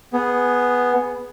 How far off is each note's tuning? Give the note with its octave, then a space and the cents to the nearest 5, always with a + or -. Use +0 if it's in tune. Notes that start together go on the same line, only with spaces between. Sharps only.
B3 +0 G#4 +0